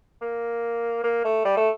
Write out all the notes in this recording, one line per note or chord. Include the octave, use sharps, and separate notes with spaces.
A#3
A#3
A3
G3
A3